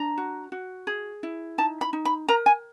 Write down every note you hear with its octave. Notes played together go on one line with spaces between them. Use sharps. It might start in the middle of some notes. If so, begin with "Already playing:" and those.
Already playing: D4 A#5
F#4
F#4
G#4
E4
D#4 A5
B5
D#4
B5
A#4 A#5
G#5